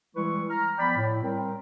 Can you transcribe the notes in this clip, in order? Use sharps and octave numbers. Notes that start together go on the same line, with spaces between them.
E3 G3 G#3 E4 B4 C#6
A#5 F6
F3 B3 D5 G5 B5
A2
G3 C4 A#4